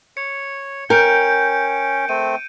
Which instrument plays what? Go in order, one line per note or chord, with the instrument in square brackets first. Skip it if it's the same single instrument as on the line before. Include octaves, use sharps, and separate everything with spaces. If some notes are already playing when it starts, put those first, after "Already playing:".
[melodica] C#5 [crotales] C#7
[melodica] C#4 [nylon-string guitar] A#4 [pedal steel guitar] G5 [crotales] G6 C#7 D7
[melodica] A3 C4 [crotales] D#7